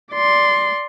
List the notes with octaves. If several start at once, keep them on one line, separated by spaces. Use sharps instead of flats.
D5 C6